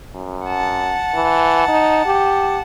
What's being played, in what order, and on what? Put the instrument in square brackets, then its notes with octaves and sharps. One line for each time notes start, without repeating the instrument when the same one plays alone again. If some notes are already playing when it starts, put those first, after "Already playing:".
[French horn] F#2
[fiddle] F#5 A5
[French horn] E3
D#4
G4